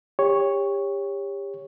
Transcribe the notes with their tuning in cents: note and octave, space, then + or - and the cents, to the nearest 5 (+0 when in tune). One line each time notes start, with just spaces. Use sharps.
G4 +30 C#5 +0